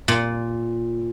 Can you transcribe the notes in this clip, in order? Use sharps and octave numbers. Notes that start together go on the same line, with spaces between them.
A#2